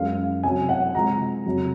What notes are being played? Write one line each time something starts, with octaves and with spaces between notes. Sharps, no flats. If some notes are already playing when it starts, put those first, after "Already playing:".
Already playing: F#2 F3 G#3 F5
C3 F#3 G#5
F#5
C3 F3 G#3 A#5
F2 C3 F#3